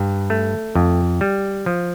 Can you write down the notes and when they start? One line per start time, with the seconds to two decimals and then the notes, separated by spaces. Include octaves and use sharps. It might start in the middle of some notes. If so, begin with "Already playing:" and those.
Already playing: G2
0.30 A3
0.75 F2
1.21 G3
1.66 F3